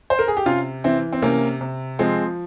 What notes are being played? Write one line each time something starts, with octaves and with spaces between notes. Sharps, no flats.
C5
A#4
G#4
G4
C3 C#4 F4
E3 C4 E4
C4
C3 A#3 C#4
C3
F3 G#3 C4